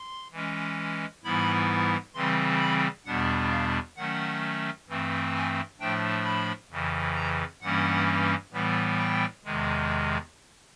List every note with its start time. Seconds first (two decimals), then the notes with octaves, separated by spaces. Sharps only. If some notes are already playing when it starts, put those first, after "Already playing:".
Already playing: C6
0.32 E3 G#3 C#4
1.23 G#2 E3 G3 B3 E4 B5
2.15 C#3 E3 G3 C4 C6
2.60 B5
3.05 E2 B2 G3 B3 D4 F#5
3.51 F5
3.97 D#3 F#3 A3 C#4 F#5
4.88 G2 E3 A3 C4
5.34 G#5
5.79 A2 F3 A3 D4 G5
6.24 B5
6.70 F2 C#3 E3
7.16 A#5
7.61 G2 E3 G3 A#3 C#4 F#5
8.52 A2 E3 G3 B3
8.98 G5
9.45 E2 C3 D#3 G#3